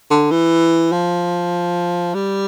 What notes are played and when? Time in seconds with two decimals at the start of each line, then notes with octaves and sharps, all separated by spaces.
0.11 D3
0.31 E3
0.92 F3
2.14 G3